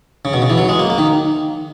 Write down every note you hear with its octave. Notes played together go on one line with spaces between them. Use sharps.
C#3
B2
C#3
E3
F#3
G#3
A#3
A#3
D#3